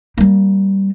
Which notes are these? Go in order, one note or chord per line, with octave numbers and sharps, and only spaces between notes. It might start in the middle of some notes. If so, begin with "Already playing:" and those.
G3 A#3